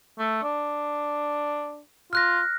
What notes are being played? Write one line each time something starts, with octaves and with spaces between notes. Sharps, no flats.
A3
D4
F4 F6 F#6 A#6